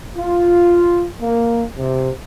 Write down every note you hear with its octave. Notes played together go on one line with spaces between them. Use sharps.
F4
A#3
C3